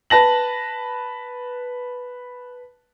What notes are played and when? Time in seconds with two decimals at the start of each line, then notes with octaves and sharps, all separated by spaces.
0.10 B4 A5 A#6 F#7